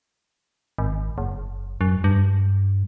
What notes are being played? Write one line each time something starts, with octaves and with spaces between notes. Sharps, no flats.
G#1
F#1
F#2
G2